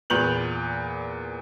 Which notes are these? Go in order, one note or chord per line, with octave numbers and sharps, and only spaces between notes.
E2 A#2 B4 G6 F7 F#7